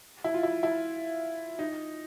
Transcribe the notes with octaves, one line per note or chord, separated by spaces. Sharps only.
E4
F4
E4
E4
D#4